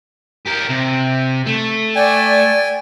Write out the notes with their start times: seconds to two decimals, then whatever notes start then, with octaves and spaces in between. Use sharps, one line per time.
0.46 G4 A#4
0.69 C3
1.47 A3
1.96 D5 G5 G#5